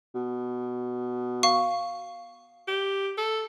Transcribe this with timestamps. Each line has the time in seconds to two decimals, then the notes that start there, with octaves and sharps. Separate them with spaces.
0.14 B2
1.43 F5 C#6
2.68 G4
3.17 A4